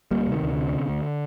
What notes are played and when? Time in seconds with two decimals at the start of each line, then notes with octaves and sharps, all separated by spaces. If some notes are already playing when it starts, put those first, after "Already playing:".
0.11 D2 G3 A#3
0.27 C3 D#3
0.43 D2
0.53 D3
0.58 C3
0.73 C3
0.89 D2